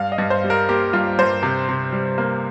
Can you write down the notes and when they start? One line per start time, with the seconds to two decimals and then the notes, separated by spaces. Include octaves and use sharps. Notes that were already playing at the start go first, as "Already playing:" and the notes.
Already playing: G2 F5
0.12 D#5
0.18 G2
0.30 C5
0.44 G3
0.50 A#4
0.69 A#3 G4
0.93 G2 F4
1.19 G2 C5
1.43 C3
1.69 C3
1.93 G3
2.18 A#3